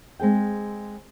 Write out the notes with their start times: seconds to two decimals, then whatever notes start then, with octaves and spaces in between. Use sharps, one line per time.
0.19 G#3 C4 G#4 G5